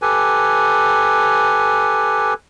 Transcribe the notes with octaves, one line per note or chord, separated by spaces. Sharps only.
G4 A4 B4 G#5